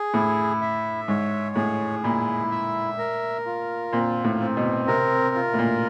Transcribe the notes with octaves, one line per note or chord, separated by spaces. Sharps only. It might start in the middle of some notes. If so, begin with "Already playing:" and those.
Already playing: G#4
A2 E4
E5
G#2 C#5
A2 G#4
A#2 E4
E5
A#4
F4
A#2 C4
A2
C4
B2
C3 A#4
F4
A2
A#2